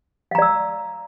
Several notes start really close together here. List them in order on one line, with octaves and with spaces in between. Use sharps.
F5 A#5 D5 E6